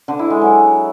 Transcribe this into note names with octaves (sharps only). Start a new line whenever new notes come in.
D3
E4
G#3
F#3